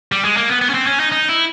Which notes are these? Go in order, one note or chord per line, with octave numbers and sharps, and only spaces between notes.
G3
G#3
A#3
B3
B3
C#4
C4
C#4
D#4
D#4
E4